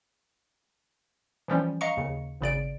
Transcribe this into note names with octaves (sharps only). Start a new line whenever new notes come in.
E3 F3 G3 C#4
D#5 F5 A#5 C#6 C#7
D#2 C#3
G#1 C#3 D5 D7